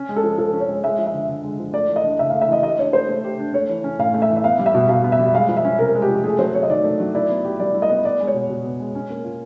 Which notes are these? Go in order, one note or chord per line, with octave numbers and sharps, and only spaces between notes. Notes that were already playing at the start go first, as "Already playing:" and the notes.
Already playing: C#4
G#3
A4
F3
F3 A4
C#4
C#5
G#3
G#3 E5
F3
E5
D3
D3
G#3
F3
A3 D5
E3
D#5
D4
C#3 E5
A3 F5
E5
E3 D#5
G4 D#5
D4 C#5
A3 C5
A3
G4
D4
A3 C#5
E3
C#4
A2 F5
A3
E5
E3
E5
B3 F5
G3
E5
B2
B2 F5
B3
E5
G3
G#3 F5
F3
E5
C#4
C3 A#4
G#3
G4
F3
A3 G#4
F#3 C5
C4 C#5
D#5
D#3 D5
A3
F#3
E4 D5
B3
G4
G3 D5
E4
D#5
B3
B3 D5
G#3
C#5
B2
B2
B3
G#3
C#4
A#3
F4